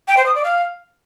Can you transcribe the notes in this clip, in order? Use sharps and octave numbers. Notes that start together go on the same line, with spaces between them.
G5
C5
D#6
D5
F5